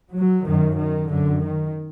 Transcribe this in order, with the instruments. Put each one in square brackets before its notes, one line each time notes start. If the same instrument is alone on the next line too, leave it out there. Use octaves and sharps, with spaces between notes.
[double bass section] F#3
F#2 D#3
D#3
F#2 D3
D#3